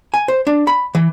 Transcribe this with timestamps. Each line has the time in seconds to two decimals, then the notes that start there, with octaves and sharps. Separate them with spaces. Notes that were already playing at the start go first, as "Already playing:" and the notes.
0.14 G#5
0.28 C5
0.47 D4
0.67 B5
0.95 E3